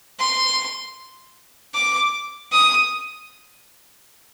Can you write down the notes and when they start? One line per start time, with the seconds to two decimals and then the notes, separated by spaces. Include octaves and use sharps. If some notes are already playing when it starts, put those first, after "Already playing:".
0.19 C6
1.74 D6
2.52 D#6